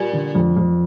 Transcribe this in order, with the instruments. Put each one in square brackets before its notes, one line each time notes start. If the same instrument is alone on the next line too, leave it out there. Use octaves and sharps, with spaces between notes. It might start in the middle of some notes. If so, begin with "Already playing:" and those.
Already playing: [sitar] A#2 [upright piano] G3
[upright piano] D3
F2
F2